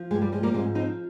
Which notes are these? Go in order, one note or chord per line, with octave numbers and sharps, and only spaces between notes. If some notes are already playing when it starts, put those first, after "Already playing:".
Already playing: F3
G2 G#3
G3
F3 G#3
G3 A#3
G#2 G#3 C4
F3 C4 D#4